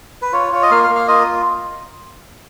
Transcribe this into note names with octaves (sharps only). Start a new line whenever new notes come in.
B4
F4 C#5
F4 C#5
D#5
A#3 F5
F5
A#3
F5
F4 D#5